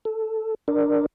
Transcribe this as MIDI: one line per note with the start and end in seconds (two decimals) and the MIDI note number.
0.05 0.55 69
0.68 1.06 62
0.68 1.06 70
0.68 1.06 74